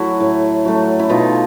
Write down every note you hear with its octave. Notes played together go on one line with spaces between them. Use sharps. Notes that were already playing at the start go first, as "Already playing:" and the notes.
Already playing: F#3 A3 E4 F#4
A2
F#3 A3
E4
B2 D#4 F4